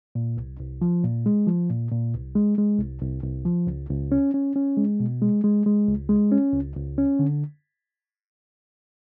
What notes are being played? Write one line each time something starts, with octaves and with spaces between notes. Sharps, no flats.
A#2
C2
C2
F3
A#2
G#3
F3
A#2
A#2
C2
G#3
G#3
C2
C2
C2
F3
C#2
C#2
C#4
C#4
C#4
G#3
B2
G#3
G#3
G#3
C#2
G#3
C#4
C#2
C#2
C#4
D3